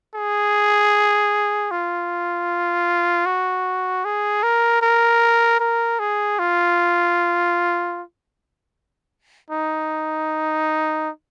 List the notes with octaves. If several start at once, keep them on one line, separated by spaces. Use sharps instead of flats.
G#4
F4
F#4
G#4
A#4
A#4
A#4
G#4
F4
D#4